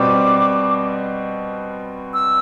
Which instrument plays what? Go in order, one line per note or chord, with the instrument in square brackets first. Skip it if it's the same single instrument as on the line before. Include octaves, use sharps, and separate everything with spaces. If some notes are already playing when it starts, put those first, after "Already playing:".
Already playing: [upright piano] B2 G3 C4 [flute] D6
[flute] E6